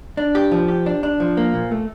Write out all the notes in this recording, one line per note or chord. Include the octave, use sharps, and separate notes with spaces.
D4
G4
F3
G4
D4
D4
F3
A#3
A#2
A3